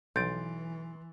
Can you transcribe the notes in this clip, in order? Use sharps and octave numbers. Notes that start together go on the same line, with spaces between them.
B1 E3 C6 G6 A6 D7